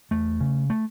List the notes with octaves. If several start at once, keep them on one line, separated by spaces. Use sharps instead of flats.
E2 A3
C#3
A3